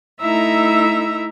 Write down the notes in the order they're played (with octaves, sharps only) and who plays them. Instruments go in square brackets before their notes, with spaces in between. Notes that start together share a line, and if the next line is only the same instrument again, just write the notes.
[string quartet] A3 D#4 E4 E5 A#5 E6